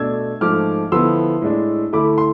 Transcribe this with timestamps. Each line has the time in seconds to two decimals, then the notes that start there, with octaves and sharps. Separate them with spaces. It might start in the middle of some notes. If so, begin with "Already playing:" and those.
Already playing: B2 A3 D4 E6 G#6
0.41 G#2 F3 A3 D6 F6
0.92 D3 F3 B3 E4 C6 E6
1.42 A2 G#3 D4
1.93 D3 A3 E4 B5 D6
2.18 C6